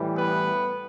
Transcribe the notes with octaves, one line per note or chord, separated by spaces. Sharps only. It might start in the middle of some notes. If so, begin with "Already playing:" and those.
Already playing: A2 E3 G3
B3 B4